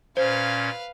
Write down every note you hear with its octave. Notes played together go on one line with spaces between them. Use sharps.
A#2 C#4 B4 C5 F5 G#6